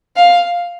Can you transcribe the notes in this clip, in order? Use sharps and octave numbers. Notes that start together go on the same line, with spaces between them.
F5